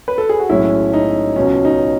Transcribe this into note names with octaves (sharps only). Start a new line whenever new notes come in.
B4
A4
G#4
F#4
B1 A2 G#3 C#4 E4
D#4
C#2 B2 F#3 C#4
D#4